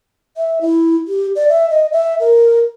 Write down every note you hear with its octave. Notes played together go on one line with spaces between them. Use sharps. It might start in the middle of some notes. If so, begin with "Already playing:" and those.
E5
E4
G4
D5
E5
D#5
E5
A#4